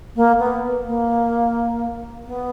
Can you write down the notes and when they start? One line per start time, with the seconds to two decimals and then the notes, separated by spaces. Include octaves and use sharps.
0.15 A#3
0.38 B3
0.86 A#3
2.26 B3